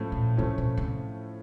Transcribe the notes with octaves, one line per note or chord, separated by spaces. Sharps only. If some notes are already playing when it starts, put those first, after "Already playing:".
Already playing: A2 F3 A3 C#4
A#2
A2 C3 F3 A3 C#4
B2
C3